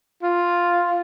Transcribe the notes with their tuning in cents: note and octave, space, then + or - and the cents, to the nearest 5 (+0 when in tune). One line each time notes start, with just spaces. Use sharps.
F4 +0